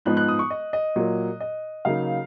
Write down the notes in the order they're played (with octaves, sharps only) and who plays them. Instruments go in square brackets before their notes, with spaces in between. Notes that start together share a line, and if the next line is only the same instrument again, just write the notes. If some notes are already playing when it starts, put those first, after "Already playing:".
[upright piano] G#2 F3 B3 D#4 F#6
F#6
D#6
C#6
D#5
D#5
A#2 F#3 A#3
D#5
C#3 F#3 A#3 D#4 F5